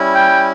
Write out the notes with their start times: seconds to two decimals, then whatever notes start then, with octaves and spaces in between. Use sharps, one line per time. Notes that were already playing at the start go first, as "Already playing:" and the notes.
Already playing: G3 C#4 E4
0.15 G5